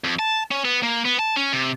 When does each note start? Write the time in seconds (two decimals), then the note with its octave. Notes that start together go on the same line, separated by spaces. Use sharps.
0.04 F2
0.19 A5
0.51 C#4
0.65 B3
0.83 A#3
1.05 B3
1.19 A5
1.37 C#4
1.53 C3